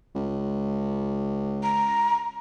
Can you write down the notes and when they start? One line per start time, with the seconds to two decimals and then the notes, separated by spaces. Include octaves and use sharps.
0.15 C#2
1.63 A#5